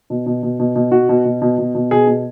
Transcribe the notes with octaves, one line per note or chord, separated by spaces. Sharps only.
B2
B2
B2
B2
B2
B2 F#4
B2
B2
B2
B2
B2
B2 G#4
B2